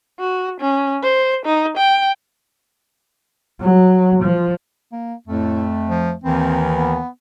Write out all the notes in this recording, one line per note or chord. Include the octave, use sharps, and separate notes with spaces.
F#4
C#4
C5
D#4
G5
F#3
F3
A#3
F2 A2 A3
F3
D#2 D#3 E3 C4
B3